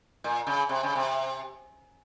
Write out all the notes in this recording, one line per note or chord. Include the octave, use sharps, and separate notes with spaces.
A#2
C#3
C3
C#3
C3